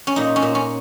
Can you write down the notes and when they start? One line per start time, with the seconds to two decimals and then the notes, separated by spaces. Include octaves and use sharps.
0.07 C#4
0.16 A#2 D#4
0.36 C#4
0.42 A#2
0.55 C#4